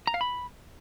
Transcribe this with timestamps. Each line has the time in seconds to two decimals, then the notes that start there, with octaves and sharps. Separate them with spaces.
0.07 A#5
0.14 F5
0.21 B5